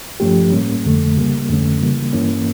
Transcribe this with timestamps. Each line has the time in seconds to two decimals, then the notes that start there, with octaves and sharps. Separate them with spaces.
0.20 G2 F3 A3 C#4 G4
0.52 A2 G3 A#3 C#4
0.85 F2 D3 A3
1.16 C#2 C#3 G3 A#3
1.49 F2 D3 A3 C#4
1.81 C#3 E3 G3 A#3
2.13 G2 E3 A#3 C#4